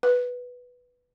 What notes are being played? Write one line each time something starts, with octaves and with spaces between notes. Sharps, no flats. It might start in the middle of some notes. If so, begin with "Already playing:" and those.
B4